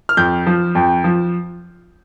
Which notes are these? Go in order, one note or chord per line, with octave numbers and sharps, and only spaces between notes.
F6
F2 G6
F3
F2
F3